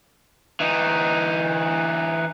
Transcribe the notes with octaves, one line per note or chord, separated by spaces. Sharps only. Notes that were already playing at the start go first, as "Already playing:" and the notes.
E3 D#4